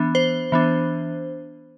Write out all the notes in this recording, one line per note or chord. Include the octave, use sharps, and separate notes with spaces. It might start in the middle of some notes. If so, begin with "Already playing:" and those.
Already playing: E3 B3 D4
C5
E3 B3 D4